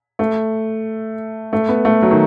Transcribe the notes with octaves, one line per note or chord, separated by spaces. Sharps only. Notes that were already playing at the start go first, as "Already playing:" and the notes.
A3
A3
B3
A3
F#3
D#3